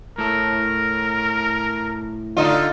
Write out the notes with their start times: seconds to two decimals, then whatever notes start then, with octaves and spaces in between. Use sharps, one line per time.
0.18 A2 A4 A#4
2.37 D3 D#4 F4